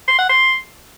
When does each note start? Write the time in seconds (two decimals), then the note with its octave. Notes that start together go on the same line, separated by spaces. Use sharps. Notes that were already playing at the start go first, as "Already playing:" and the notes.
0.08 C6
0.18 F#5
0.29 C6